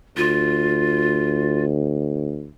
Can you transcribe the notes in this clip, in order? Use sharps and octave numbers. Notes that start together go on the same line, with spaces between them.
D2 F4